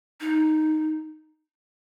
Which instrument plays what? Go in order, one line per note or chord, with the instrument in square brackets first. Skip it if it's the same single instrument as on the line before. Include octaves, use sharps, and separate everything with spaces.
[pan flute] D#4